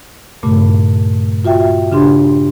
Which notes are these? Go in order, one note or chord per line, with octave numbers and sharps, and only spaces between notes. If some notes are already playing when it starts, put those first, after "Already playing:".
G2 A#2 C#3 A3
F4 F#4 E5 G5
C#3 D4 G4 C6